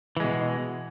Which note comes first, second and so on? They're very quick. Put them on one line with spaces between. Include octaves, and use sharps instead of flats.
E3 G#3 B2